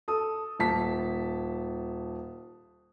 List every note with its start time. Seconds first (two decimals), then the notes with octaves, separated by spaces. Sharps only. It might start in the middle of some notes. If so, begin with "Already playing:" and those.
0.08 A4 D#6
0.59 D#1 A5 B6